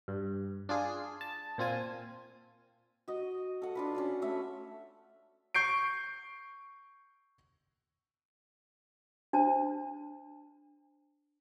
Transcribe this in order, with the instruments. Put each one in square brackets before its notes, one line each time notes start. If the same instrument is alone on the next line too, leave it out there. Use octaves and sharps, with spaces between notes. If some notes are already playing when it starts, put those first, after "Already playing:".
[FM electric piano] G2
D4 F4 G#4
A5
A#2 C4 F4 G#5
[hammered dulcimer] F#4 D#5
A4 F#5
D4 F4 B4
C#4 D4 F#4
A3 C#5 E5
[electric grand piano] C#6 G6 C7 D7
[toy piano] D4 C5 A5